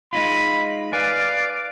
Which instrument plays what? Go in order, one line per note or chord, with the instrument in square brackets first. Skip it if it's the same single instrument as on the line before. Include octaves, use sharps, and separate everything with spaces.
[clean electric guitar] G#3 D#4 F4 [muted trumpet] B5
[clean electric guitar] B4 G#5 [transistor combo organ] D5 [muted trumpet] F5